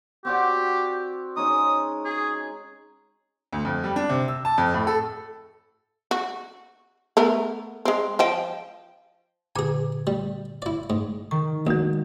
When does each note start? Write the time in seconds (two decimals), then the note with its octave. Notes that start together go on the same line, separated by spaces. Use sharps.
0.25 C4 F#4 G4 D5
1.37 G#3 C#4 D#4 D#6
2.05 G#4
3.53 D2
3.65 F2
3.84 G3
3.96 D4
4.09 C3
4.28 E6
4.45 A5
4.58 F2
4.74 A2
4.87 A4
6.11 F#4
7.17 A3 B3 A#4
7.85 G#3 C4
8.19 F3 D#5 G5
9.56 A#2 D3 G#4 G#5
10.07 G3
10.62 E4 D5
10.90 G#2
11.31 D#3 C#6
11.67 A#1 G#3 F#4